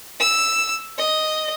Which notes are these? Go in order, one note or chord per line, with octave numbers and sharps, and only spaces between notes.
E6
D#5